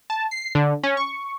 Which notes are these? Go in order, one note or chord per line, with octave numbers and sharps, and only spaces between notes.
A5
C7
D3
C#4
C#6